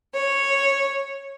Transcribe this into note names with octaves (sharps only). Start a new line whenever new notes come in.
C#5